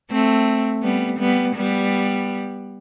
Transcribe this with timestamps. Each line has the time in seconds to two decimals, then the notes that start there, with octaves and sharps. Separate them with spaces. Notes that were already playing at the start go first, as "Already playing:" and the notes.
0.11 A3 C4
0.83 G3 B3
1.20 G3 B3
1.56 G3 B3